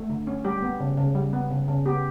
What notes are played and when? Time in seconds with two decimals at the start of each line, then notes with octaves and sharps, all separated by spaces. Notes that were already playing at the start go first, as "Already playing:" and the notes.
Already playing: A3
0.10 D3
0.27 C#4
0.45 G3 G4
0.62 B3
0.80 C#3
0.97 C#3
1.15 G3
1.33 B3
1.50 C#3
1.68 C#3
1.86 B3 G4